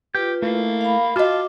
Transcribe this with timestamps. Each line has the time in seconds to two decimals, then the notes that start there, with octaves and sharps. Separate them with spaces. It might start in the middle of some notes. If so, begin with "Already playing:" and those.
0.15 F4 G4 B4 G6
0.42 A3 A#3 E4
0.81 F5 B5
1.16 F4 F#4 D#5 A5 D6 F6